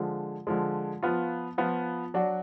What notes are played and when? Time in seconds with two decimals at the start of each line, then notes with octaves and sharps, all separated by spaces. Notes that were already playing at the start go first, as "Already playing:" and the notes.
Already playing: D3 F3 G#3
0.47 D3 F3 G#3
1.03 F3 B3 F4
1.58 F3 B3 F4
2.14 F#3 D4 F#4